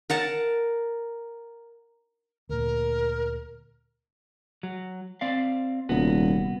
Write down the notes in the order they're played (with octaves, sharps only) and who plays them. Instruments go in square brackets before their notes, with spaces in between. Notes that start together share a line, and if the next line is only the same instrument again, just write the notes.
[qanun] A#4 F#5 A5
[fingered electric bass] D2 A#2 [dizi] A#4
[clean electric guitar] F#3
C4 D5 F5
[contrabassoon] D#1 [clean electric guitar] C2 B3 F#4